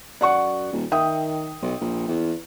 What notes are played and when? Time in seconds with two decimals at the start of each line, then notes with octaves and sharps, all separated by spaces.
0.21 F#2 D5 F#5 C#6
0.72 D#1
0.92 D#3 E5 G5 D#6
1.62 B1
1.81 A#1
2.08 E2